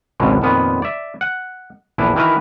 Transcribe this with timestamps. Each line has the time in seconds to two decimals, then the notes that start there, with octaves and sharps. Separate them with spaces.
0.20 G#1 C#2 B2 D3 F#3 G#3
0.42 F2 A#2 D#3 B3 D5 F#5
0.82 D5 E5
1.21 F#5
1.98 A#1 E2 D4 E4
2.16 D#3 E3 E4 F#4 A#4 B4